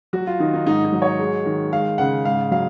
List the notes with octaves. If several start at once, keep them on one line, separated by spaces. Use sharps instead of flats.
F#3 F#4
F4
D#3 D#4
D#4
G#2 D#4
D#4
F#3
C#5
G#3
D#3
G#3 F5
C#3 F#5
G#2 F5
F#3 F5